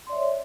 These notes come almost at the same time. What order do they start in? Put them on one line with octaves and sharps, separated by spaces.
C6 D5 E5 C#5